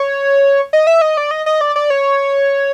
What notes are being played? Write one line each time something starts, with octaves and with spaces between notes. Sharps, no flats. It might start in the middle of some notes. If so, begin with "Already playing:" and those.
Already playing: C#5
D#5
E5
D#5
D5
D#5
D#5
D5
D5
C#5